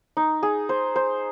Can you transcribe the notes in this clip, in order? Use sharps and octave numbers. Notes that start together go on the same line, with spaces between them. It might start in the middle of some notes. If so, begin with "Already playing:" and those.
D#4
G#4
C5
C5